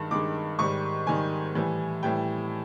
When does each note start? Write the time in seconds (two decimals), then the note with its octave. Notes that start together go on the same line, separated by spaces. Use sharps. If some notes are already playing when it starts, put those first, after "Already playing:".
Already playing: G2 D#3 G#3
0.11 G2 D#3 G#3 D6
0.59 G#2 D#3 G3 C#6
1.07 G#2 D#3 G3 G#5
1.55 A2 E3 G3
2.03 A2 E3 G3 G5